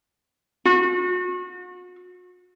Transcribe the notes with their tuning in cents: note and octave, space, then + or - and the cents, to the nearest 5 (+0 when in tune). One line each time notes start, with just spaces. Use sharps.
F#4 -40